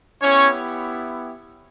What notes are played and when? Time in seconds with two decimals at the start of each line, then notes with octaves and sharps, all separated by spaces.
0.22 B3 C#4 E4 G4 C#5